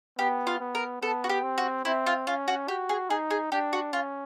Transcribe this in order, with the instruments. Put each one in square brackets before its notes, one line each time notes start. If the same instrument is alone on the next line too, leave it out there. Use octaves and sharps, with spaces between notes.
[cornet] B3 [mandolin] G4
[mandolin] F4
[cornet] B3
[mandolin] A#4
[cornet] B3 [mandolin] A4
[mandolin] F#4
G4
[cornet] C4
[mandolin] F#4
[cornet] C4 [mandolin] E4
[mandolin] F4
[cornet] C#4 [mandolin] F4
[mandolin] F#4
[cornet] F#4 [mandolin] G4
[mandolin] G#4
[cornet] D#4 [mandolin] G#4
[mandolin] G#4
[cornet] D4 [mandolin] G4
[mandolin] F#4
[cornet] C#4 [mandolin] F4